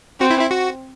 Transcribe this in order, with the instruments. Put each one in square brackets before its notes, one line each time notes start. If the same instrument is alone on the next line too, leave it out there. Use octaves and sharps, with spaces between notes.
[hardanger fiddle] C4 [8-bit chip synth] F#4
[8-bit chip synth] E4
E4
F#4